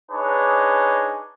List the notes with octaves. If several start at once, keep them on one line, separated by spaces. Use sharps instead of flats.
D4 D#4 G#4 B4 C#5